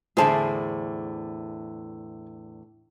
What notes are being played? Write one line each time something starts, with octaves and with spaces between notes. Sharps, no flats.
E2 A2 D3 G#4 C5 A5